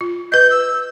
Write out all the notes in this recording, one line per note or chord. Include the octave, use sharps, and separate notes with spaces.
F4
B4 D#5 G6
E6